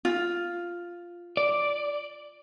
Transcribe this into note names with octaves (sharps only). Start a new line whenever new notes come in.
F4
D5